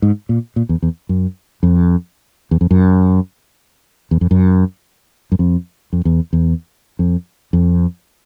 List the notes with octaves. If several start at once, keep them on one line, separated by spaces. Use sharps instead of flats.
G#2
A#2
A#2
E2
E2
F#2
F2
E2
F2
F#2
E2
F2
F#2
F#2
F2
F2
E2
E2
F2
F2